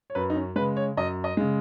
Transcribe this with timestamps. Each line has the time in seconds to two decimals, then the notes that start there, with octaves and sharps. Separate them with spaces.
0.10 C#5
0.15 F#2 B4
0.30 D#4
0.36 C#4
0.56 C#3 G#3 B4
0.76 C#5
0.97 F#2 D#5
1.24 D#5
1.37 C#3 G#3